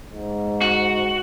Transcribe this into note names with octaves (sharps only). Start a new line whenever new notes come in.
G#2
F#4